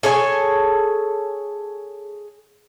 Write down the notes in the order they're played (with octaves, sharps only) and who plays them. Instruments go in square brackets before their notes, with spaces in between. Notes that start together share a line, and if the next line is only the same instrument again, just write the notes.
[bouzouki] G#4 A4 C#5 G#5